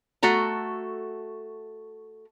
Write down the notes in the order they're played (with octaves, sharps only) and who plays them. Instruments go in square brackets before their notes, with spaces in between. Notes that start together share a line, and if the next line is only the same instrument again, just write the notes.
[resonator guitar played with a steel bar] A3 F#4 A4 A#5